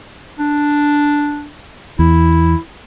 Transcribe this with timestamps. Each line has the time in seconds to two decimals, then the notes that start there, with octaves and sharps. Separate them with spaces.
0.39 D4
1.99 E2 E4